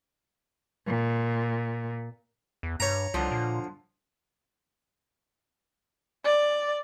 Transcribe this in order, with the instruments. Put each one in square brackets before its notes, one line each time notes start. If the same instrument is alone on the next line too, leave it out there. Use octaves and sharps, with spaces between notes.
[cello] A#2
[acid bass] E2
[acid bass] G2 [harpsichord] C#5 A#5
[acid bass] C2 [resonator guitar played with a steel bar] D3 F3
[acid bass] A#2
[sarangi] D5